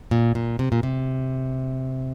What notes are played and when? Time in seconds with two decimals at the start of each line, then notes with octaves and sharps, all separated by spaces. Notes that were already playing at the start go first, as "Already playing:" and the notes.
0.11 A#2
0.35 A#2
0.59 C3
0.72 A#2
0.83 C3